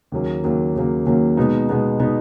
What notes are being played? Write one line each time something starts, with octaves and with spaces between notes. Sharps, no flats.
D#2 C#3 F#3 A#3
D#2 C#3 F#3 A#3
D#2 C#3 F#3 A#3
D#2 C#3 F#3 A#3
B2 G#3 B3 D#4
B2 G#3 B3 D#4
B2 G#3 B3 D#4